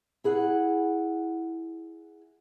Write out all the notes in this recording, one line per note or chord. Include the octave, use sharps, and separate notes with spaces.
E4 G#4 F#5